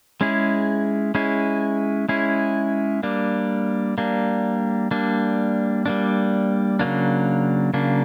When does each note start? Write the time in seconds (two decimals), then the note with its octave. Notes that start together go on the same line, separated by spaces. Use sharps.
0.21 G#3 C#4 E4 G#4
1.15 G#3 C#4 E4 G#4
2.09 G#3 C#4 E4 G#4
3.03 G3 A#3 D4
3.98 G3 A#3 D4
4.91 G3 A#3 D4
5.86 G3 A#3 D4
6.79 C#3 F#3 A#3 D4
7.74 C#3 F#3 A#3 D4